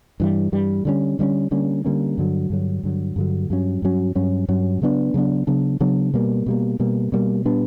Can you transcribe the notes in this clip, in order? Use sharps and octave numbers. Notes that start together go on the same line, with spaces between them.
G2 E3 G3
G2 E3 G3
D3 G3 A#3 C#4
D3 G3 A#3 C#4
D3 G3 A#3 C#4
D3 G3 A#3 C#4
G2 D3 F#3
G2 D3 F#3
G2 D3 F#3
G2 D3 F#3
G2 F#3 C#4
G2 F#3 C#4
G2 F#3 C#4
G2 F#3 C#4
C#3 F#3 B3 D4
C#3 F#3 B3 D4
C#3 F#3 B3 D4
C#3 F#3 B3 D4
B2 G3 A#3
B2 G3 A#3
B2 G3 A#3
B2 G3 A#3
A#2 G3 B3 D4